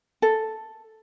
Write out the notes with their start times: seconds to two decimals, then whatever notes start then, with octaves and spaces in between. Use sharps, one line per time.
0.22 A4